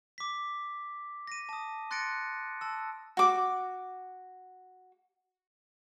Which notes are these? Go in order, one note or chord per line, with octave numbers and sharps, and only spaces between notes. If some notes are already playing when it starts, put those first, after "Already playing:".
D6 B6
A#6 D#7
A5 D#6
C6 F#6 A6 A#6 C#7 D7
A5 E6
F#4 D6